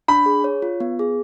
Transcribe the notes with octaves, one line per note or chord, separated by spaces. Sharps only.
D4 B5
G#4
C#5
F4
B3
G#4